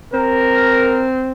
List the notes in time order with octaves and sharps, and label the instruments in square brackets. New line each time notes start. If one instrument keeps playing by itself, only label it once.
[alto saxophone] C4 [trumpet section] A#4